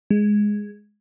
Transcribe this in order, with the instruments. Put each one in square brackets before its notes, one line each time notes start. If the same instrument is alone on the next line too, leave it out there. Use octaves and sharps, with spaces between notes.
[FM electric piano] G#3